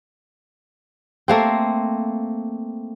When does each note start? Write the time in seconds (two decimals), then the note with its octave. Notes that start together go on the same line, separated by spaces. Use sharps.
1.28 A3 A#3 C4